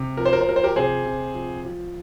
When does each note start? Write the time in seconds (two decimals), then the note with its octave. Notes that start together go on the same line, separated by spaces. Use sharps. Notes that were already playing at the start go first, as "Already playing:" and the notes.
Already playing: C3
0.17 F3 A#4
0.25 C5
0.33 A#4
0.41 C5
0.47 F3 A#4
0.56 C5
0.63 G4 A#4
0.76 C3 G#4 C5
1.05 C3
1.34 F3
1.65 F3